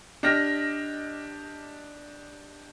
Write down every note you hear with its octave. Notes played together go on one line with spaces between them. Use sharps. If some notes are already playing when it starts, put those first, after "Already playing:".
D4 G4 D#5 F6 A#6